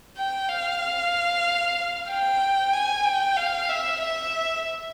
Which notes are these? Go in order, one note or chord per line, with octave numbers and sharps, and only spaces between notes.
G5
F5
G5
G#5
G5
F5
E5
E5